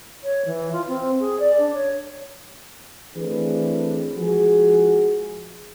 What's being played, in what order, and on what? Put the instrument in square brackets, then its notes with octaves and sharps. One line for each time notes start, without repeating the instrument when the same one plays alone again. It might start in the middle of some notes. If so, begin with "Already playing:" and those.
[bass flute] C#5
E3
F4
C4
G#4
D5
D4
C#5
[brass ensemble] E3 A3 C4 D4 G#4 B4
F3 G#3 F#4 G#4